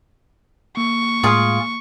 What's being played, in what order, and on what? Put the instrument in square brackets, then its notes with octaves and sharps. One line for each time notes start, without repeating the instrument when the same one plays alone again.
[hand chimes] A#3 [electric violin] C#6
[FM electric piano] A2 G#3 [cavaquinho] F4 G#4 F5